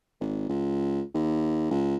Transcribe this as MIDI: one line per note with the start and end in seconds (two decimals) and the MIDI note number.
0.21 0.48 32
0.49 1.02 37
1.14 1.69 39
1.71 1.96 37